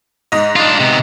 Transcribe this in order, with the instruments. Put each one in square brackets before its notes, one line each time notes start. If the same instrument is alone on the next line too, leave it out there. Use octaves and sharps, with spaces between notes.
[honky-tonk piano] G#2 D#5
[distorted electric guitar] D4 F4
C3 B3